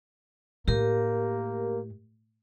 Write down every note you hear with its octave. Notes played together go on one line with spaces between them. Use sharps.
A2 A#3 G4 A#4